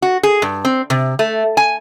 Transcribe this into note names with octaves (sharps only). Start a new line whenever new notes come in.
F#4
G#4
G2
C4
C3
A3
G#5